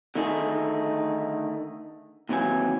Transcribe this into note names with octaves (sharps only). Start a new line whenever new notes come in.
D3 D#3 A3 D#4 G#4
D#2 C3 E3 F#3 G#5